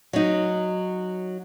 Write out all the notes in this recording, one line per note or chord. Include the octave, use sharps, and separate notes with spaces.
F#3 D#4